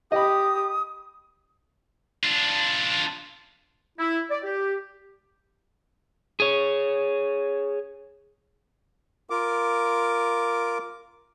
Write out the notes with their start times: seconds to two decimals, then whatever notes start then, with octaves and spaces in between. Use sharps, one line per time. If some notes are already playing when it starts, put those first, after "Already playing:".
0.12 G4 D#5 B5 D#6
2.23 D4 F4
3.98 E4
4.31 D5
4.44 G4
6.40 G#4 C#5
9.30 F4 A#4 D6